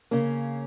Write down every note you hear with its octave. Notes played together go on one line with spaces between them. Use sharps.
C#3 A#3 C#4